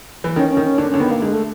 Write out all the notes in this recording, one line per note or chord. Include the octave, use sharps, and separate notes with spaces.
E3
D#3 C#4
C#4
D#3
C#4
D3 D4
D3 C#4
D#3 B3
A#3
D3 G#3
A3